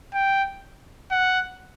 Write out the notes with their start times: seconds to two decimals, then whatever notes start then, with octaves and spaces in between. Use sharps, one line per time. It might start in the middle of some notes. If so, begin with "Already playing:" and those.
0.14 G5
1.11 F#5